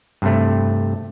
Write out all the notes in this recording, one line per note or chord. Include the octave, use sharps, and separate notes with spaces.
G2 C3 A3